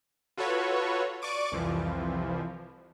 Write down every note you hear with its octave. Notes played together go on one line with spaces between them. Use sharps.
F4 F#4 A4 B4 C#5
D5 C#6 D6 D#7
C2 F2 E3 F3